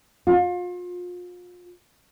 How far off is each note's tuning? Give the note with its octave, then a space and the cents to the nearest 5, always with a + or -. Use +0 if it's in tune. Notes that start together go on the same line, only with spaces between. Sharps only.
F4 +35